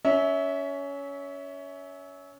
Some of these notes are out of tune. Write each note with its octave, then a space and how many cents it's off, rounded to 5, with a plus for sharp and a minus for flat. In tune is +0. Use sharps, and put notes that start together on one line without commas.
C#4 +20 E5 -20